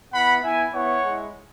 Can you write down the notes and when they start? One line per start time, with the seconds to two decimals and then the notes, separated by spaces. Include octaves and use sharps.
0.13 B3 E4 F#5 B5
0.42 B3 E4 E5 G#5
0.73 B3 E4 C#5 F#5
1.04 G#3 E4